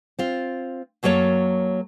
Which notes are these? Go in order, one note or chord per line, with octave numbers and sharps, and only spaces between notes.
C4 F4
F#2 F#3 A#3 A4 C#5